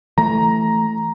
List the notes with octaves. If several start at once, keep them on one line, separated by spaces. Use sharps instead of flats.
E3 A3 A#5